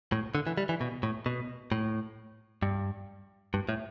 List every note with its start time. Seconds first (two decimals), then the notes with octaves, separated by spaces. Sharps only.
0.12 A2
0.35 D3
0.47 E3
0.57 G3
0.69 E3
0.81 B2
1.03 A2
1.26 B2
1.72 A2
2.62 G2
3.54 G2
3.69 A2